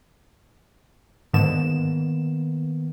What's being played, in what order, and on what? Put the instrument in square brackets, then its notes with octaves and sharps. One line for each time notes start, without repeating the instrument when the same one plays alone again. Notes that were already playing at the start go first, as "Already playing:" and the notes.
[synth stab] G#2 D3 E7 [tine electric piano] D#3 A#3 B3